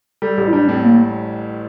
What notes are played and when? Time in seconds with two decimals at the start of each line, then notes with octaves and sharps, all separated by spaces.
0.22 G3 A4
0.37 A1 G4
0.48 E4
0.53 G3 D4
0.68 A2 C4
0.83 A#3